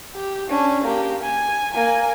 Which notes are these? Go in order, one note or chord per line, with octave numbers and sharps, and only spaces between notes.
G4
C#4 D4
A#3 G4
G#5
A#3 G#5